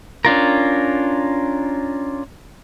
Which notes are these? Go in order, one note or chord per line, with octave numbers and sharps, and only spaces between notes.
C#4 D4 F4 A#4